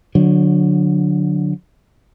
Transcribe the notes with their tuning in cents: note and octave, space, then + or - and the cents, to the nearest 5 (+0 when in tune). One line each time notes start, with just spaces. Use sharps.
D3 +0 F#3 -30